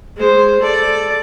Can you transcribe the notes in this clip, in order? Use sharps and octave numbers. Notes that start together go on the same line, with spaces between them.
G#3 C5
A4 D5